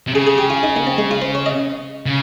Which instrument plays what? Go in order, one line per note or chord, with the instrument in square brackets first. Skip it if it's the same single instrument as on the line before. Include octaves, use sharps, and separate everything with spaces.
[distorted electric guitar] C3
[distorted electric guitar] C#3 [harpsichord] G#4
[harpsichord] G#4
G4
F4
D#4
A#3
C4
G#3
F4
C5
C#5
D#5
[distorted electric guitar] C#3